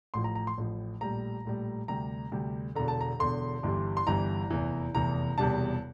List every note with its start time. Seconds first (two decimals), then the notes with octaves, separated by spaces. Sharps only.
0.14 A1 A2 F3 C6
0.24 A#5
0.35 A#5
0.47 C6
0.58 A1 A2 F3
1.01 A#1 A2 G3 A#5
1.45 A#1 A2 G3
1.88 D2 C3 G3 A#5
2.32 D2 C3 G3
2.75 E1 E2 D3 A#5
2.88 A5
3.01 A#5
3.19 E1 E2 D3 C6
3.63 G1 G2 E3 G3
3.97 C6
4.07 G1 G2 E3 G3 A#5
4.50 F1 E2 E3
4.94 F1 E2 E3 A#5
5.38 E1 E2 C3 G3 A5